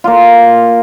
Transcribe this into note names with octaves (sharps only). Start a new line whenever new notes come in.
A#3 F4